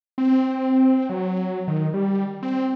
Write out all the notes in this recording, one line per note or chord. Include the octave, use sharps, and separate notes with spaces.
C4
F#3
D#3
G3
C4